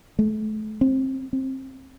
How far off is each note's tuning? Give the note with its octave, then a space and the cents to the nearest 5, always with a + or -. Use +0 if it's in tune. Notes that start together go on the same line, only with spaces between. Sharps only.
A3 -35
C4 +20
C4 +20